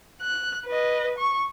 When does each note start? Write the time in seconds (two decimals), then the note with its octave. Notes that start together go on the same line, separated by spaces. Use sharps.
0.21 F#6
0.67 B4 D#5
1.18 C#6